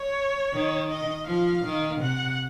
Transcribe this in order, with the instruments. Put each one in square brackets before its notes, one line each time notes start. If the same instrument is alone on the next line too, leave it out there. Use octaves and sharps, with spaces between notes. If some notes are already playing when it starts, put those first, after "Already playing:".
Already playing: [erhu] C#5
[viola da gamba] D#3
[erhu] D#5
[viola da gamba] F3 [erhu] F5
[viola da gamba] D#3
[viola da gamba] C3 [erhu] F#5